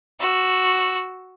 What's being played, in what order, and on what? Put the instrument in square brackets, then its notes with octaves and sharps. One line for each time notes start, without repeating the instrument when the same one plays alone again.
[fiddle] F#4 E6